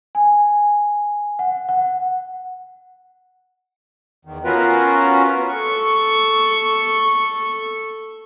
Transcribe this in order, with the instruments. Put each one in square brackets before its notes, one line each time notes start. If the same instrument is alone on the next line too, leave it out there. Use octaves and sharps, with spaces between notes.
[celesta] G#5
F#5
F#5
[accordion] E2 D#3
B3 C#4 F4 F#4 A#4 B4
[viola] A4 C#6